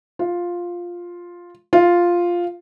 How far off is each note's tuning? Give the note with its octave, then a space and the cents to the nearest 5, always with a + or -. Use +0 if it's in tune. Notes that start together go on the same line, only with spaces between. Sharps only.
F4 +5
F4 +0